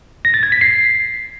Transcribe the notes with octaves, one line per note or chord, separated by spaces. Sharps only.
A#6
A6
G#6
B6
C7